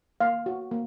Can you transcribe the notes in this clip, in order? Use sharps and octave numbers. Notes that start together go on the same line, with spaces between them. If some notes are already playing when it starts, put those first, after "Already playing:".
A#3 F5
F#4
A#3